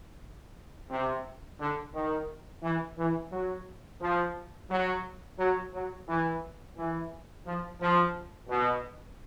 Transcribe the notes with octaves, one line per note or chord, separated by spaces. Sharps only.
C3
D3
D#3
E3
E3
F#3
F3
F#3
F#3
F#3
E3
E3
F3
F3
B2